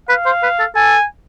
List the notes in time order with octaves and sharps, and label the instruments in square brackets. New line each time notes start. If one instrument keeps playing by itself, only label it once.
[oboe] B4 [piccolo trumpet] F5
[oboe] C5
B4
A4
[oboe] A4 [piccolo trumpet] G#5